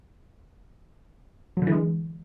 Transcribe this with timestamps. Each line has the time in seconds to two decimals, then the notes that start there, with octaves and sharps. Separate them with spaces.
1.57 F#3
1.62 D3
1.67 E3
1.72 G#3